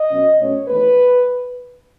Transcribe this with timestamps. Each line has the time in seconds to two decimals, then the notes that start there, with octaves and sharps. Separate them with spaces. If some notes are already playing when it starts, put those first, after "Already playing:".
Already playing: D#5
0.10 B2 F#3 C#4
0.39 B2 A3 C#4 C#5
0.68 E2 D#3 A3 B4